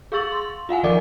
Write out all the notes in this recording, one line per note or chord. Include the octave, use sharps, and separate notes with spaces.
G#4 F5 C#6 E6 A6 F#7
C6
F4 F5 F#5 G#5
D#3 F3 A#4 D5 D#5 D6